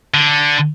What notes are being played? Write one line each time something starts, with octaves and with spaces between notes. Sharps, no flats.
D3